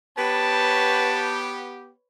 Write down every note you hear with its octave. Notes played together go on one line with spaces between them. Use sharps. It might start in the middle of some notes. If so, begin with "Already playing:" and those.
B3 G4 B4 C#5 A5